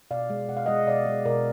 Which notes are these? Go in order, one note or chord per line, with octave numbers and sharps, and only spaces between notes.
B2 D5 F5
G#3
B2 F#5
F5
G#3 D#5 F#5
B2 D5 F5
G#3
B2 A#4 D5